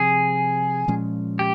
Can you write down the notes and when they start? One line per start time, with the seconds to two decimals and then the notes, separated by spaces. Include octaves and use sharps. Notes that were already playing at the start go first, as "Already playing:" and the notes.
Already playing: C3 F3 C4 G#4
0.88 A#2 F3 G#3 C#4
1.39 G4